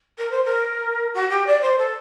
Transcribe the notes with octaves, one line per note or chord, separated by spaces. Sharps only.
A#4
C5
A#4
F#4
G4
D5
C5
A4